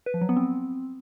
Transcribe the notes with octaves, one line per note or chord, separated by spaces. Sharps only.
B4
F3
F#3
B3
C4